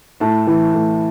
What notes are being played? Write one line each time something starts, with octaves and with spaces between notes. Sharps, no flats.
A2 A5
E3
A2